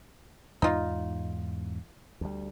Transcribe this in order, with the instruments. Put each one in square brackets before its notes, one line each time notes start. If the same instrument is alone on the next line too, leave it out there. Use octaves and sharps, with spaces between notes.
[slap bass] E2 G#2 [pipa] D#4 F4
[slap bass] D2 G3